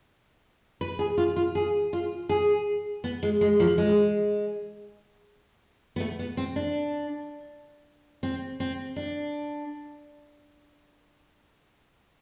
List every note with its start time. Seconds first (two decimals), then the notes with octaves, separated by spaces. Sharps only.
0.81 B4
0.99 G#4
1.18 F4
1.36 F4
1.55 G#4
1.93 F4
2.29 G#4
3.04 B3
3.23 G#3
3.41 G#3
3.60 F3
3.78 G#3
5.96 B3
6.00 A3
6.19 B3
6.37 C4
6.56 D4
8.23 C4
8.60 C4
8.96 D4